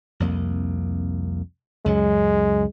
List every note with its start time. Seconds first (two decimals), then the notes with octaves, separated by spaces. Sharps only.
0.20 C2 F2 A#3
1.86 C#2 F#2 F#3 G#3